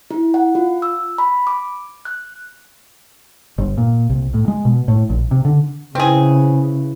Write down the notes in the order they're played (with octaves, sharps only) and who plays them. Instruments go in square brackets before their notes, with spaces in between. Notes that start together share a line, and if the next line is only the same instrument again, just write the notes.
[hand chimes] E4
F#5
F4
E6
B5
D6
F#6
[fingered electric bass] G1
A#2
C2
A2
G#3
B2
A2
A#1
C3
D3
[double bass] C#3 [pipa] C4 G#4 [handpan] E4 B4